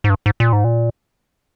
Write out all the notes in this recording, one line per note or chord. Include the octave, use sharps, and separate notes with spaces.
G#2
G2
G#2
A#2
G#2
A#2